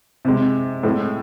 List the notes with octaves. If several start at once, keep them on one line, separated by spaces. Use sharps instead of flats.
C3 G#3
A2 G#3